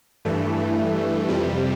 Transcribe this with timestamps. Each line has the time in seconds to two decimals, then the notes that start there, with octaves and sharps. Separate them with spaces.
0.25 G2 E3 A3
1.28 F2 C3 G3